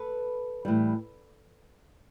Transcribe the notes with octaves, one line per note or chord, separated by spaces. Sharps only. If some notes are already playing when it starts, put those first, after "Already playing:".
Already playing: A4 B4
A2 E3 G3